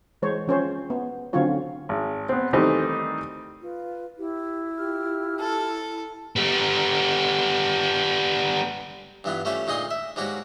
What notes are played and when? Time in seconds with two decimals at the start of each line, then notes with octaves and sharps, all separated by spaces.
0.22 E3 G#3 C5 C#5
0.47 F3 C#4 C5 C#5
0.90 B3
1.33 D3 F#3 C4 C#4 F4 C#5
1.89 G#1
2.29 B3 C4
2.53 D#3 E3 G3 A3 C4 D#4
3.62 F4 B4
4.18 E4 G4
4.77 F4 G4 F6
5.40 A4
6.36 G3 B3
9.24 G2 E3 B3 F4
9.45 G3 A3 C#4 F4 E5
9.67 D2 A#2 D#4 G#4 C6
9.91 E5
10.16 G#2 G3 A#3 F#4 C#5